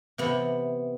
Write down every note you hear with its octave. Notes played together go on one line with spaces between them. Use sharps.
C3 E3 B3